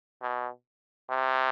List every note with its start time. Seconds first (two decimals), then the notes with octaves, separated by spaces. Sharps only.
0.22 B2
1.10 C3